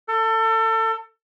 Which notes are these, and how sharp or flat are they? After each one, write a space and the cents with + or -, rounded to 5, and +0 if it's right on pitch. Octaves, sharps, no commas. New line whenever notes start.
A4 +30